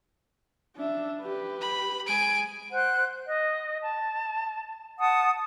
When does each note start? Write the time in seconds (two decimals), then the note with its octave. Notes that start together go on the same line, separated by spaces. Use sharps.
0.76 D4 E5
1.21 G4 B4
1.61 B5
2.07 G#3 G#5 D7
2.71 C5 F#5 F#6
3.27 D#5
3.83 A5
4.99 F#5 A5 D#6